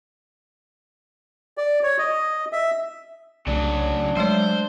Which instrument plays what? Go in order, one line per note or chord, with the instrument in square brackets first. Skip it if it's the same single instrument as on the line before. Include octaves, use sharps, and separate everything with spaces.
[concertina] D5
C#5
D#5
E5
[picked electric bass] C2 G#3 A3 [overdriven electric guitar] C#3 F#3 [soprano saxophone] D4
[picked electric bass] F#3 [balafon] G#3 A3 C#5 [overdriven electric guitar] C5